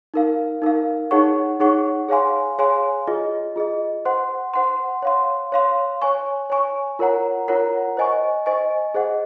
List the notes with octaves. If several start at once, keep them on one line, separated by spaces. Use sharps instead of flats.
D#4 A#4 F5
D#4 A#4 F5
D#4 G#4 C#5 F#5 C#6
D#4 G#4 C#5 F#5 C#6
G#4 C#5 F5 G#5 C6
G#4 C#5 F5 G#5 C6
F4 G#4 D#5
F4 G#4 D#5
C5 F#5 C6
C5 F#5 C6
C#5 F5 C6
C#5 F5 C6
C#5 G#5 C#6
C#5 G#5 C#6
F4 A#4 C#5 F#5 A#5
F4 A#4 C#5 F#5 A#5
C5 D#5 G#5 C#6
C5 D#5 G#5 C#6
G#4 C5 D#5 F#5